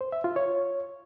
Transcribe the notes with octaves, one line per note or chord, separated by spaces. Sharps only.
C5
E5
F4
C#5